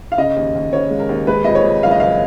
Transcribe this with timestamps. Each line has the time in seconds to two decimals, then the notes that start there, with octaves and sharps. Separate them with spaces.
0.12 F5
0.18 C#3 D#5
0.36 D#2
0.55 D#2
0.73 C#3 C#5
0.90 G#3
1.00 A#4
1.09 D#2
1.27 G#3 B4
1.45 F2 D#5
1.55 C#5
1.64 F2
1.83 F#1 F5
1.91 D#5
2.00 F#1 F5